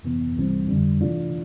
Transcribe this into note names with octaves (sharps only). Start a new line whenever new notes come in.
F2 C3 E3 B3
C2 C3 E3 G3 C4
F2 D3 G3 D4
C3 E3 A3 D4 F4